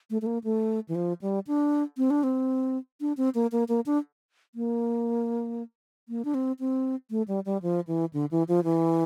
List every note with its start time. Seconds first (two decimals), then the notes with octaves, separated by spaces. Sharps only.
0.10 A3
0.22 A3
0.26 A#3
0.44 A3
0.89 E3
0.95 F3
1.22 G3
1.47 D4
1.97 C4
2.10 D4
2.23 C4
3.01 D4
3.17 C4
3.35 A#3
3.52 A#3
3.69 A#3
3.86 D4
4.55 A#3
6.09 A#3
6.25 D4
6.34 C4
6.60 C4
7.10 A3
7.28 G3
7.46 G3
7.62 F3
7.87 E3
8.13 D3
8.31 E3
8.48 F3
8.64 E3